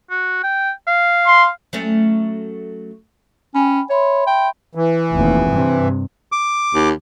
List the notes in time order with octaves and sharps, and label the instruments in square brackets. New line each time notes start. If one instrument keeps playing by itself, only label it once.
[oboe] F#4
G5
F5
[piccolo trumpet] C6
[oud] F#3 A3 C#4
[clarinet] C#4 [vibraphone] G5 G#5 B5
[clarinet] C#5 [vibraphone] E5 B5 C6
[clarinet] G5
[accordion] E3
[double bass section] F1 D#2
G2 C3
[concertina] D6
[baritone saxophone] D#2